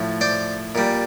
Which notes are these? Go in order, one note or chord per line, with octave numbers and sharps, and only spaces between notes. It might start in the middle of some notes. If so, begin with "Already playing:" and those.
Already playing: A2 F3
C5 D5
A#2 G3